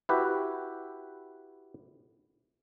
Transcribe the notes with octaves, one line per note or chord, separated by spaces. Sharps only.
E4 F#4 G4 B4